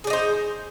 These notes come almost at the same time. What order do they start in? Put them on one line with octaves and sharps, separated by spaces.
G#4 D4 D#4 C5